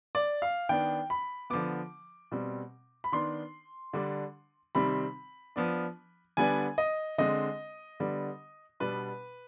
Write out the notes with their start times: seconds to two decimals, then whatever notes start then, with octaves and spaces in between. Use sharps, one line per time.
0.15 D5
0.42 F5
0.69 D#3 B3 D4 G5
1.10 B5
1.50 D3 F3 B3 D6
2.32 B2 G3 C4
3.04 B5
3.12 D#3 B3 D4 C6
3.93 D3 G3 D4
4.75 C3 D#3 G3 C4 B5
5.56 F3 B3 D4
6.37 D3 G3 B3 D4 G#5
6.78 D#5
7.18 D3 G#3 C4 D#5
8.00 D3 G3 B3
8.80 B2 G3 B3 D4 B4